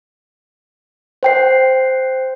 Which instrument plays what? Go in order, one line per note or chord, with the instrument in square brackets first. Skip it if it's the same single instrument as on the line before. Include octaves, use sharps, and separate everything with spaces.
[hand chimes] C5 G5 C7